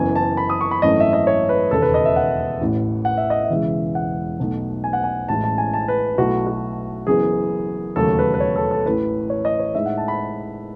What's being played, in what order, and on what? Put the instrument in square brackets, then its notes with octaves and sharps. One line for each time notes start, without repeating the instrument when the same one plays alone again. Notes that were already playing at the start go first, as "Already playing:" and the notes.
Already playing: [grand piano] F#1 F#2 E3 B3 G#5
A5
B5
D#6
C#6
B5
G#1 F#2 E3 A3 C#4 D#5
E5
D#5
C#5
B4
E1 D#2 C#3 A4
B4
D#5
E5
F#5
A1 A2 E3
F#5
E5
D#5
E5
E1 E2 C#3 E3 G#3
F#5
B1 B2 A3 D#4
G#5
F#5
G#5
A1 A2 G#3 C#4 E4 A5
A5
G#5
A5
B4
B1 B2 A3 E4 F#4
F#4
F#1 F#2 E3 B3 G#4
E1 D#2 C#3 F#3 A3 A4
B4
B4
C#5
A4
A4
A1 A2 E3 B4
C#5
D#5
C#5
A2 G#3 D#4 E5
F#5
A5
B5